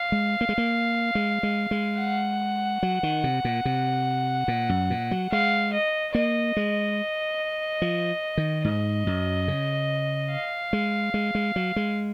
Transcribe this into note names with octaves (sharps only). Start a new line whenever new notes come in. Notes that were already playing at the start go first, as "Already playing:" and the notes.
Already playing: F5
G#3
A#3
G#3
A#3
G#3
G#3
G#3
F#5
F#3
D#3
C3
A#2
C3
A#2
F#2
A#2
F#3
G#3 F5
D#5
A#3 D#5
G#3
F3
D#3
G#2 D#5
F#2
C#3
F5
G#3
G#3
G#3
F#3
G#3